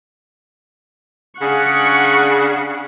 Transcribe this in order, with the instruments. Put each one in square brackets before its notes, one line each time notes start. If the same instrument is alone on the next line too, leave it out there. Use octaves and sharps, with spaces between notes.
[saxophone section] C#3 D4 G#4 [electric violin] F#5 C#6